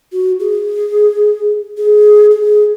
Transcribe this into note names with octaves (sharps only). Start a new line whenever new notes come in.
F#4
G#4
G#4
G#4